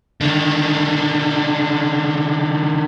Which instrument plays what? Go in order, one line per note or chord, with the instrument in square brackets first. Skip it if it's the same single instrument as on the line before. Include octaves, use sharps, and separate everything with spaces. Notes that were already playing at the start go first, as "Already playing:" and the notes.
[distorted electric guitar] D3 D#3